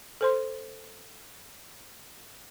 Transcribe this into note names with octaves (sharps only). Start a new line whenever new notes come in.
A4 C5 C6